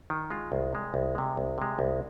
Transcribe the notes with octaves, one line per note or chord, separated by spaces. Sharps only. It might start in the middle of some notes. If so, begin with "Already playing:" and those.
D#3
G#3 F4
C2
C3 G#3
C2
C3 G#3
C2
C3 G#3
C2